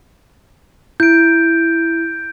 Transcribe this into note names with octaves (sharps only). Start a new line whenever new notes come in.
E4 G6 D7